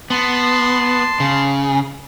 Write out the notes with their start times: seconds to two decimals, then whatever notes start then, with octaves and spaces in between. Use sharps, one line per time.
0.10 B3 A5 C6
1.20 C#3